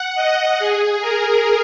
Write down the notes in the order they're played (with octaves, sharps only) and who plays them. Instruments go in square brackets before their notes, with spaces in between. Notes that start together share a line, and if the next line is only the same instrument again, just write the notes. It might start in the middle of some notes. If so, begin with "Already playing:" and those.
Already playing: [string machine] F#5
D#5
G#4
A#4